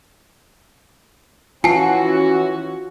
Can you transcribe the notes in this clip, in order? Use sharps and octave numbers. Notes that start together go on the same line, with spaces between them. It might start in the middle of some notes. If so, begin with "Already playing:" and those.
E3 C#4 F4 F#4 G#5 A5 C7